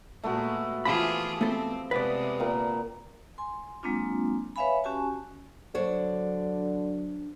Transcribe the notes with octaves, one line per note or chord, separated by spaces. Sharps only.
A#2 G#3 A3 B3 F#4
E3 F3 F4 G4 G#4 B5
A3 B3 C4 A4
C3 G#3 B3 B4 D5
A#2 A#4 G5
G#5 C6
F#3 G#3 A#3 C4 D4 F4
B4 C#5 E5 F5 G#5 B5
C#4 F#4 G4 G#5 A5
D3 F#3 D4 C5 C#5